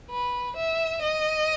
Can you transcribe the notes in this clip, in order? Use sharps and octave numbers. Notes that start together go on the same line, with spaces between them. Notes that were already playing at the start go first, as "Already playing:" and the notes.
B4
E5
D#5